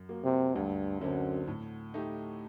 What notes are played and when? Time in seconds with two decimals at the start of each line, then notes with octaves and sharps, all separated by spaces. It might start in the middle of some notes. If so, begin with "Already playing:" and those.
Already playing: F#2
0.09 F#3 A#3
0.24 C3
0.55 D2 G2
1.01 F#2 D3 F#3 C4
1.47 A2
1.94 A3 D#4 G4